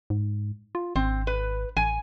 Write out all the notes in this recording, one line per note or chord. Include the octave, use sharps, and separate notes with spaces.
G#2
F4
G#1 C4
B4
A1 G#5